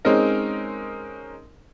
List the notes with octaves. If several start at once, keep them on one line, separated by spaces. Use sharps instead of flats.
G#3 C4 C#4 D#4 A#4 D#5